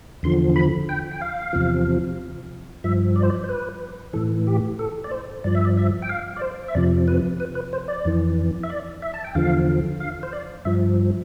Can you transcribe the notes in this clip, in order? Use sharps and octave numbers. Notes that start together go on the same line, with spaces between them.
E2 D3 F3 C6
B5
G5
G5
F5
E2 C3 F3
G2 F3 E5
D5
C5
D5
C5
B4
A2 E3 A4
G4
A4
D5
C5
G2 F3 D5
E5
D5
E5
G5
F5
D5
C5
E5
F2 C3 F3 D5
B4
B4
B4
C5
D5
F2 E3
E5
D5
E5
A5
G5
E2 D3 F3 F5
F5
C5
D5
G2 F3 E5